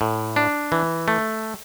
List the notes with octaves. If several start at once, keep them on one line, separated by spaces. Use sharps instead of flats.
A2
D4
E3
A3